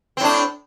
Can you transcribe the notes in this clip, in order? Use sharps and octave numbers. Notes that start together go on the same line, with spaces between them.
A2 C4 D4